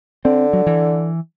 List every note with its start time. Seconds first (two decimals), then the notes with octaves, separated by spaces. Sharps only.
0.25 D3 C4
0.53 F#3
0.66 E3